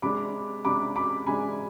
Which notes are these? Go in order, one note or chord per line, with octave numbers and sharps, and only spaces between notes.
C3 G#3 D4 B5 D6
C3 G#3 D4 B5 D6
B5 D6
C3 G#3 D4 G#5 B5